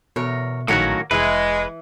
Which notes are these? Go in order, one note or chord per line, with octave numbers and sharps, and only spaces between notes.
E2 B2 A#4 C#5
A#1 A2 D#3 F#3 A#3 C#4 F#4
F1 E3 G#3 B4